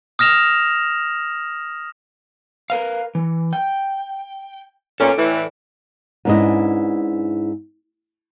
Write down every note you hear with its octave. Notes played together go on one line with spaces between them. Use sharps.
D#6 F6 A#6 E7 F7
A#4 B4 F5
E3
G5
A#2 B3 C#4 A4 D5
A2 E3
G#2 B3 C#4 D4 E4 D#5